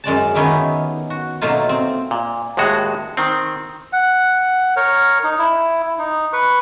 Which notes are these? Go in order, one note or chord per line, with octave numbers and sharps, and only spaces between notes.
F#2 G#3 D5 A5
D#3 B3 C#4 D#4 E4 G4
F#4
B2 F#3 A3 A#3 D#4 F4
C4
A#2
D#2 A2 G#3 F#4
D#3 C4
F#5
A#4 C#5
D#4
E4
D#4
B4 C#6